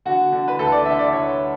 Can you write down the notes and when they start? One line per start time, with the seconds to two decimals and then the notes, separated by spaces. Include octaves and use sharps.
0.05 D3 F#4
0.32 D3
0.48 B4
0.59 D2 A4
0.72 D5
0.85 D3 E5
0.99 D5
1.13 D2 C#5